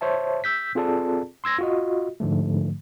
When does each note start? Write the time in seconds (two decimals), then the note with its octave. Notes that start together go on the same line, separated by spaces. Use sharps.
0.01 C5 C#5 E5 A5
0.44 E6 G6 B6
0.75 C4 F4 G#4 A4 D5 A5
1.44 C6 E6 G#6 A#6
1.59 F4 F#4 D#5
2.20 G#2 D3 F3 A3